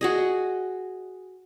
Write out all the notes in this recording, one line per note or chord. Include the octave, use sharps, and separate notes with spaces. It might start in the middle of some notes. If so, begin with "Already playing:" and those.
F#4 G#4 D#5